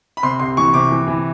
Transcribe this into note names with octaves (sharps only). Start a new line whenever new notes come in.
B5
C3 C6
C2 C6
E3 C#6
C3 D6
E3
E3